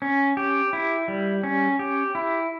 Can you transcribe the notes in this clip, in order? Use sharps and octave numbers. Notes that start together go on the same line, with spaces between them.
C#4
G4
E4
G3
C#4
G4
E4